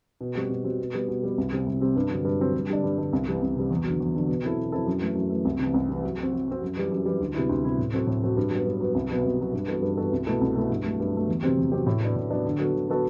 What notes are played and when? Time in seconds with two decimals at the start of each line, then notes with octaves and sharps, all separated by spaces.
0.21 B2
0.35 G3 C4 F#4
0.50 B2
0.64 G3 C4 F#4
0.80 B2
0.94 G3 B3
1.08 B2
1.23 G3 B3
1.38 C2
1.52 C3 G3 C4
1.66 C2
1.81 C3 G3 C4
1.96 G2
2.10 D3 F#3 C4
2.25 G2
2.40 D3 F#3 C4
2.54 G2
2.68 D3 G3 D4
2.84 G2
2.98 D3 G3 D4
3.13 C2
3.27 C3 E3 G3
3.42 C2
3.55 C3 E3 G3
3.70 E2
3.84 D3 F#3
4.00 E2
4.15 D3 F#3
4.28 B2
4.43 F#3 C4 E4 A4
4.58 B2
4.72 F#3 C4 E4 A4
4.86 F#2
5.02 E3 A3
5.16 F#2
5.30 E3 A3
5.45 C2
5.59 C3 E3
5.74 C2
5.89 C3 E3
6.04 F#3
6.19 C4 F#4
6.33 F#3
6.48 C4 F#4
6.62 F#2
6.77 E3 G3
6.91 F#2
7.06 E3 G3
7.20 D2
7.34 C3 G3 B3 E4
7.49 D2
7.64 C3 G3 B3 E4
7.78 A2
7.94 F#3 C4 F#4 A4
8.07 A2
8.23 F#3 C4 F#4 A4
8.37 G2
8.51 F#3 B3
8.66 G2
8.80 F#3 B3
8.94 C2
9.10 B2 F#3 B3
9.24 C2
9.39 B2 F#3 B3
9.53 G2
9.68 E3 B3 F#4 A4
9.82 G2
9.97 E3 B3 F#4 A4
10.12 C2
10.26 B2 A3 E4 A4
10.41 C2
10.55 B2 A3 E4 A4
10.70 G2
10.84 F#3 A3
11.00 G2
11.13 F#3 A3
11.28 E2
11.43 C3 F#3 C4 G4
11.58 E2
11.72 C3 F#3 C4 G4
11.87 A2
12.00 F#3 B3 D4
12.16 A2
12.30 F#3 B3 D4
12.45 D3
12.59 F#3 B3 F#4 A4
12.73 D3
12.88 F#3 B3 F#4 A4